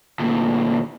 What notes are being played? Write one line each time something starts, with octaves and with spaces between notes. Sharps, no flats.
D2 A#2